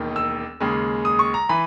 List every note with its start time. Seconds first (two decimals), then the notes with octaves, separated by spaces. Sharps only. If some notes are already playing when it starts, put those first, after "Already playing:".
Already playing: E1 D#2 D#3
0.16 E6
0.60 D#2 C#3 G#3
1.05 D#6
1.19 C#6
1.34 A#5
1.49 E3 B5